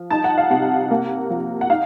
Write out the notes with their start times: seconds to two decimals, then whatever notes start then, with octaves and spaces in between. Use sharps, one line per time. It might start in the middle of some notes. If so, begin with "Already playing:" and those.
Already playing: F3
0.10 D#4 A5
0.24 F#5
0.38 F5
0.50 C3 F#5
0.91 A#3
1.30 F3
1.61 F#5
1.69 D#4 F5